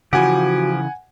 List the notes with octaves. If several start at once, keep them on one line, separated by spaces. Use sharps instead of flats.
C#3 E3 F3 F#4 G4 F#5 G#5